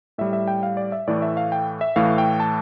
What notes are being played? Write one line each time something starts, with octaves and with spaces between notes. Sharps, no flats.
A2 G3 E5
E5
G5
F5
D5
E5
A2 E3 A3 D5
E5
F5
G5
E5
A2 E3 A3 F5
G5
A5